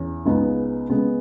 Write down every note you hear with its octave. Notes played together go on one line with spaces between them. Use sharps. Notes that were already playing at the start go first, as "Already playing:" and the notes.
Already playing: E2 C#4
C#2 C#3 G#3 B3 D#4
C#3 G#3 B3